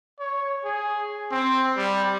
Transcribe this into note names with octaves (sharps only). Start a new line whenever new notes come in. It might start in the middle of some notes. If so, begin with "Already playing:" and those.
C#5
G#4
C4
G3